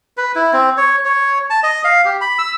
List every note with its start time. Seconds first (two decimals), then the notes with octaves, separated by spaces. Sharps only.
0.17 B4
0.35 E4
0.53 C4
0.77 C#5
1.05 C#5
1.50 A5
1.63 D#5
1.84 F5
2.05 G4
2.21 B5
2.39 E6